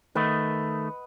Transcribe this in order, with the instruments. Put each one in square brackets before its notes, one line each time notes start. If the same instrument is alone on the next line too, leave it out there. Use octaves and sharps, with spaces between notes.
[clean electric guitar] D#3 A3 [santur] B4 D#5 F#5